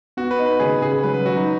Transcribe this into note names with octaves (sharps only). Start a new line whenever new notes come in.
B3 F#4
B4
D#4
B4
C#3 G#4
C#3 G#4
F#3 B4
B4
F#3 F#4
D#4